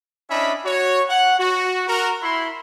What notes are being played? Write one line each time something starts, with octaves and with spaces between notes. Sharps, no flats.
C#4 D4 E4 D#5 E5 B5
F#4 C#5
F#5
F#4
F#4 A#4
E4 B5 C6